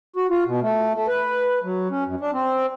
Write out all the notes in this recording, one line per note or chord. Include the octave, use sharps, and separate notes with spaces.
F#4
F4
B2
A3
A3
B4
F#3
C#4
F#2
D4
C4